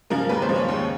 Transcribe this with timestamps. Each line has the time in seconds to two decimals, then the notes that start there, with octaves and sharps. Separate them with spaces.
0.10 C#3 F3 G#3 A#4
0.29 D#2 B4
0.42 C5
0.49 C#3 F3 G#3
0.56 C#5
0.69 D#2